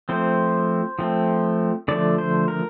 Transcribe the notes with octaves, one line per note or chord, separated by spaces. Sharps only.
F3 A3 C4 C5
F3 A3 C4
D3 F3 A3 D5
C5
A#4